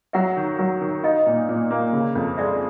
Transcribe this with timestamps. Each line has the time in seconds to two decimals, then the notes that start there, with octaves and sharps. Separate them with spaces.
0.13 F#3 E5 F#5
0.37 D#3
0.59 F#3
0.81 D#3
1.03 D#4 D#5 F5
1.27 A#2
1.49 A#2
1.70 A#3
1.93 C#3
2.15 F2
2.37 G#3 D5 E5